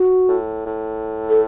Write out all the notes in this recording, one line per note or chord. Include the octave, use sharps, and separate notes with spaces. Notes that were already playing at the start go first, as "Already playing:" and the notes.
Already playing: F#4
A2
A2
A4